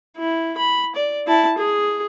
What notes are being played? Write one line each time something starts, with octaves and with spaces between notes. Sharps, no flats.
E4
B5
D5
E4 A5
G#4